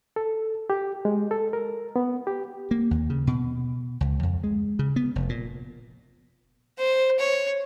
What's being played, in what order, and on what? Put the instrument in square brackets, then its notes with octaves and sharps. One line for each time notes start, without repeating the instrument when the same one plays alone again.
[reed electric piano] A4
G4
G#3
A4
A#4
B3
G4
[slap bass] A#3
D#2
C#3
B2
C#2
F2
G#3
C#3
B3
F1
A#2
[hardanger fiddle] C5
C#5